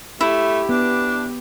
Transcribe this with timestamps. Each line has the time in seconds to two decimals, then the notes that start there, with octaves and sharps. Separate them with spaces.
0.21 A3 E4 G4
0.69 B3 D4